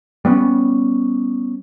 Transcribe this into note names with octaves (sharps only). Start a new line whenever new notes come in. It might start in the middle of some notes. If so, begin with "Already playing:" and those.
G3 B3 C#4